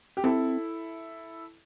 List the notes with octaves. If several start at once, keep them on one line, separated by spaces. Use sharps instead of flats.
G4
C4 E4 A4